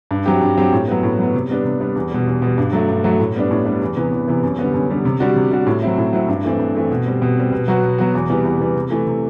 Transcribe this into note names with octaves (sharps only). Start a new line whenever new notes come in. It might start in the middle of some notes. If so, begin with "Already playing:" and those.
G2
F#3 C4 G4
G2
F#3 C4 G4
A2
F#3 B3
A2
F#3 B3
C3
G3 B3 D4
C3
G3 B3 D4
E2
B2 G3
E2
B2 G3
G2
F#3 A3
G2
F#3 A3
A2
G3 B3 D4
A2
G3 B3 D4
E2
C3 E3 B3
E2
C3 E3 B3
F#2
D3 G3 B3
F#2
D3 G3 B3
C3
G3 D4 F#4
C3
G3 D4 F#4
A2
F#3 C4 E4
A2
F#3 C4 E4
G2
E3 A3 C4
G2
E3 A3 C4
B2
G3 C4
B2
G3 C4
B2
F#3 B3 F#4
B2
F#3 B3 F#4
E2
C3 E3 G3 B3
E2
C3 E3 G3 B3
C3
E3 A3 E4
C3